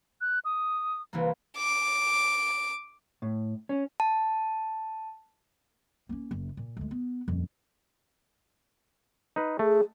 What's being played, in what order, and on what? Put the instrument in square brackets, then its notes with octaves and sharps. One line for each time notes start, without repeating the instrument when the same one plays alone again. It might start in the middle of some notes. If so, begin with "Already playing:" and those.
[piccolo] F#6
D#6
[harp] C2 E3 A#3
[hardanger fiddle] D6
[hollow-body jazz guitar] A2
C#4
[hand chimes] A5
[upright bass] A#3 C#4
F#1
A#2
D2 G#3
B3
D#1 F2
[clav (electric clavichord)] D#4 B4
[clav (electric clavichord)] A3 [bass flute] G#4